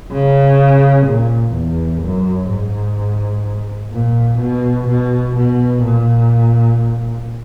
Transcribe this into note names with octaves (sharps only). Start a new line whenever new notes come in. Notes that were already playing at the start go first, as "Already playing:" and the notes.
C#3
A#2
E2
F#2
G#2
A#2
B2
B2
B2
A#2